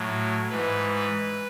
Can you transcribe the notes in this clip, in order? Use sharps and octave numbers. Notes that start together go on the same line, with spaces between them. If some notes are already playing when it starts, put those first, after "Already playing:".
Already playing: A2 F#3
G#2 E3 B4